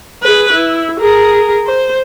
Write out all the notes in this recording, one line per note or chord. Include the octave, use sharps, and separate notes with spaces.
G#4 B4
E4
G#4 A#4
C5